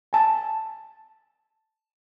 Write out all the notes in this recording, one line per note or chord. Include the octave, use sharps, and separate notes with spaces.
G#5 A5